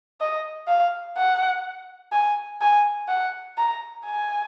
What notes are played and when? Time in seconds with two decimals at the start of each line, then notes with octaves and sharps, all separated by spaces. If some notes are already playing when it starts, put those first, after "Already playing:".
0.21 D#5
0.68 F5
1.17 F#5
2.12 G#5
2.61 G#5
3.08 F#5
3.57 A#5
4.05 G#5